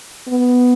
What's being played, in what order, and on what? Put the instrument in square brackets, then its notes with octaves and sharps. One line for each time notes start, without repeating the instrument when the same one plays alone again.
[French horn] B3